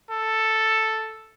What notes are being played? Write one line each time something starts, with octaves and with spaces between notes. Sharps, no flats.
A4